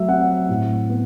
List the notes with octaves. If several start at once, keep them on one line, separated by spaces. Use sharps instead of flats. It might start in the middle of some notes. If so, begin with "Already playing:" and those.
Already playing: F#3 A3 E5
C4 F#5
A2
B3